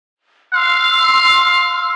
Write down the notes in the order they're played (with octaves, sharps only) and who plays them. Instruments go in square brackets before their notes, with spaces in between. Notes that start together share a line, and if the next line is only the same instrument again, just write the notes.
[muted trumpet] F5 [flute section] C6 E6